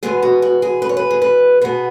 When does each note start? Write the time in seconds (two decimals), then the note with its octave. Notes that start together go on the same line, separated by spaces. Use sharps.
0.03 E2 B2 G#3 B3 G#4
0.22 F#4
0.42 F#4
0.62 G#4
0.82 B4
0.89 C#5
0.97 B4
1.11 G#4
1.22 B4
1.61 B2 B3 G#4